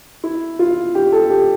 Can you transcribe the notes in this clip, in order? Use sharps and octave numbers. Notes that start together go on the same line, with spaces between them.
E4
F4
G4
A4
G4